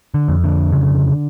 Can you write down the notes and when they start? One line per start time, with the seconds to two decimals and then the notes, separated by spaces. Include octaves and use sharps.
0.14 D3
0.28 F2
0.44 D3
0.72 C#3